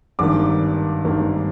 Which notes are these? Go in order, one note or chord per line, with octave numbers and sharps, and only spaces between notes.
G#1 G2 D#3 A#3 D6
G#1 G2 D#3 A#3